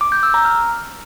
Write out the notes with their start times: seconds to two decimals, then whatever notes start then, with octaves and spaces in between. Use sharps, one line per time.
0.01 D6
0.12 G6
0.23 E6
0.34 A#5
0.45 F6